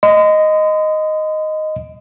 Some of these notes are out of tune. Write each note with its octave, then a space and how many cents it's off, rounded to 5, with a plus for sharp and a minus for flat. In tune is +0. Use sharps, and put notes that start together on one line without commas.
D#5 +0 C6 -45